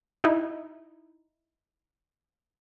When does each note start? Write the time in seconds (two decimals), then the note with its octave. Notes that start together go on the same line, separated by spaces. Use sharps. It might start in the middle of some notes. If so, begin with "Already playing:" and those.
0.24 D#4 E4